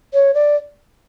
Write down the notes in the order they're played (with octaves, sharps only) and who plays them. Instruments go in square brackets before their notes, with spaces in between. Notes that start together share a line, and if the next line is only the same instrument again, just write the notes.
[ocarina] C#5
D5